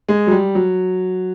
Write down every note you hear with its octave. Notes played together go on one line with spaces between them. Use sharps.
G#3
F#3
G3
F#3